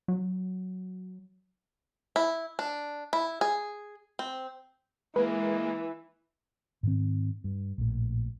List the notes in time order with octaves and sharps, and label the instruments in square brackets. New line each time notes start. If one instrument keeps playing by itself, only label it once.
[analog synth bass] F#3
[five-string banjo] E4
D4
E4
G#4
C4
[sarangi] E3 [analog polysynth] G#3 A#3 [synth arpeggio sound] B4
[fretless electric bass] G#2 D#3 C4
G2
A#1 A2